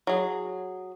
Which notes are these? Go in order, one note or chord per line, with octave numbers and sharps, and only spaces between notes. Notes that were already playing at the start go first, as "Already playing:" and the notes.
F#3 G#4